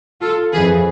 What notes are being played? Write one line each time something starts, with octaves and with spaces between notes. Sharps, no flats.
F4 A4
F2 E3 G#4 B4